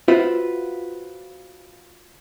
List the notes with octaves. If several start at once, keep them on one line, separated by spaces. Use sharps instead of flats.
F4 F#4 B4 C5 E5